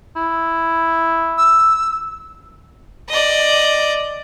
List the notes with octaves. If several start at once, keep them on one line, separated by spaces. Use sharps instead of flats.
E4
E6
D5 D#5